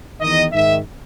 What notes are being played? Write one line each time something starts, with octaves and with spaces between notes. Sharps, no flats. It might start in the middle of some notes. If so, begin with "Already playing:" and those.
E2 D#3 D#5
G#2 D#3 E5